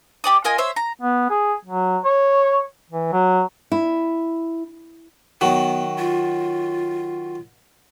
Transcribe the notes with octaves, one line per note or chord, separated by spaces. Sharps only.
G4 D5 D#6
F4 A#4 D#5 G#5
C5 C#5 E5
A#5
B3
G#4
F#3
C#5
E3
F#3
E4
D#3 F#3 B3
F4